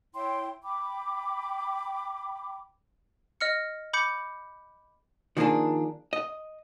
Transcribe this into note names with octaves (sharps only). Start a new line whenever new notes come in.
E4 C#5 G5 C6
G5 B5 D6
D#5 F6 C#7
B5 D6 G6 C#7
D#3 F3 A#3 C#4 D4 G#4
D#5